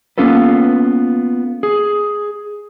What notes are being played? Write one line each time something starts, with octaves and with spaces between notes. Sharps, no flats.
A#3 B3 C#4 F4 A4 B4
G#4